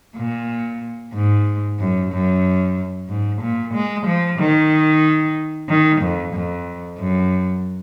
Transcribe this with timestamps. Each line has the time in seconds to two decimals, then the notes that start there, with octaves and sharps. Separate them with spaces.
0.16 A#2
1.14 G#2
1.79 F#2
2.12 F#2
3.09 G#2
3.42 A#2
3.74 G#3
4.07 F3
4.39 D#3
5.69 D#3
6.01 F2
6.34 F2
6.99 F#2